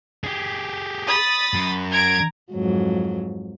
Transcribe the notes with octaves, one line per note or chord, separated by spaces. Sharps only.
G4 G#4
B5 D#6 A6
F#2
A#5 G#6 D7
F2 G#2 F#3